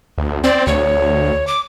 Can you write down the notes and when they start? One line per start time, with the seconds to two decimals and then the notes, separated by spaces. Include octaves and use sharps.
0.18 D2
0.44 C4 D5
0.67 D2 C#5
1.47 D6